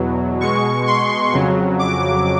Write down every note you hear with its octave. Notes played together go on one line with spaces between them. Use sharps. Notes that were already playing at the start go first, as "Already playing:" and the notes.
Already playing: E2 B2 F#3
B2 G#3 C#6
C6
F2 C#3 F#3
D6